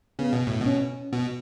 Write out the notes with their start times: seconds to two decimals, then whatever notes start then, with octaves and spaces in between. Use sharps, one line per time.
0.19 C#3 B3
0.33 B2
0.47 A2
0.61 B2
0.66 C#4
1.13 B2